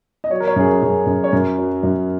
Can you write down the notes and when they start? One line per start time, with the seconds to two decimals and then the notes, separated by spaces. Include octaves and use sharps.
0.24 D#5
0.30 F#3 C#5
0.40 A#4
0.47 C#5
0.56 F#2 G#4
0.65 A#4
0.82 F#2 G#4
1.06 F#2
1.24 C#5
1.33 F#2 A#4
1.58 F#3
1.83 F#2